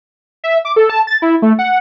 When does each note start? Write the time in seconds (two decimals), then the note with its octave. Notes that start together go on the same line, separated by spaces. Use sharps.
0.44 E5
0.65 D6
0.76 A4
0.90 A5
1.07 A6
1.22 E4
1.42 A3
1.59 F#5